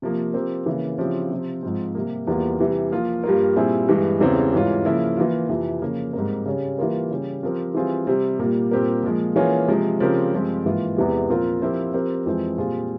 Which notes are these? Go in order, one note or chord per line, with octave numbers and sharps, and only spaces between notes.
C3 F3 A#3
F3 C4 G4 A#4
C#3 E3 A#3
C#3 F3 C4 E4 G4
C3 F3 C4
G#2 F3 C4
C3 G3 A#3
E2 E3 G3 A#3 F4
C3 E3 G3
F3 A#3 F4
G2 G3 A#3 F4 A#4
A#2 G3 C4 E4 G#4
G2 E3 G#3
E2 C#3 E3 G3 C4
G#2 E3 G3 C#4 F4
C#3 F3 A#3 E4
E3 A#3 F4
F2 C3 E3
C#3 F3 A#3
G#2 G3 C4 G4 A#4
C#3 G3 C#4
E3 G3 A#3 F4 A#4
C#3 G3 C#4
F3 C4 G4 A#4
E3 G3 C4 F4 G#4
C3 G3 C4
A#2 G3 A#3
A#2 G3 C4 G4 A#4
A#2 F3 G#3
E3 A#3 C#4 F4 G#4
C3 F3 G#3
C#3 F3 C4 G4 A#4
G2 F3 G#3 C4
G#2 E3 A#3 F4
E2 C3 E3 G#3
A#2 F3 C4 F4 A#4
F3 C4 E4 G4 A#4
F3 C4 G4 A#4
F2 E3 G#3 C4
A#2 G3 C4 F4 G#4